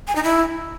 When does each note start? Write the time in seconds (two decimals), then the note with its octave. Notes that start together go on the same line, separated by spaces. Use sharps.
0.08 G#5
0.16 D#4
0.24 E4